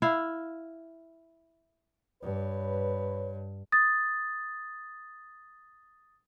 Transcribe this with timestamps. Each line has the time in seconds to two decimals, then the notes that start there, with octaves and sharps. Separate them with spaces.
0.02 E4 F5
2.23 G2 B4 C#5
3.72 D#6 A6